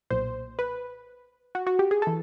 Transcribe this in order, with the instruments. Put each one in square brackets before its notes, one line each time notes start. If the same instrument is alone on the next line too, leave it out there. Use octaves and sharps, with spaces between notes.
[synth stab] B1 A#2 C5
B4
F#4
F#4
G4
G#4
E3 A4